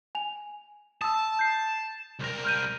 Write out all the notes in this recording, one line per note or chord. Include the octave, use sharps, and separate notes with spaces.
G#5 F7
A5 D#6 E6
G6 C7
C2 A#4
F6 G6 D#7